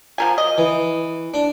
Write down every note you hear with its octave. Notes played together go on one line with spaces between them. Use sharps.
F3 A#4 G#5
D#5
E3
D4